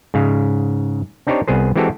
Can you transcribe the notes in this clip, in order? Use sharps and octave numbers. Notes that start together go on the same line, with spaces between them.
G#2 C#3 F5
C4 D4 D#4 G4 C5 C#5
C2 B3 G#4 C5
E3 G#3 C4 F#4 G4 A4